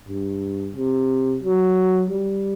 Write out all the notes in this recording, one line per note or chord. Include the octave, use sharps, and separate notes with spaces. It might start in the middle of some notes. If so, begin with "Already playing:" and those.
G2
C3
F#3
G3